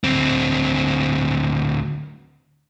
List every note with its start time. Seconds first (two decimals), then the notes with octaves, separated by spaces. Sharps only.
0.04 D2 C4